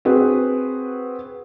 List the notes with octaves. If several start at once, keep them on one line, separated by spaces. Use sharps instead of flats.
C4 F#4 G#4 B4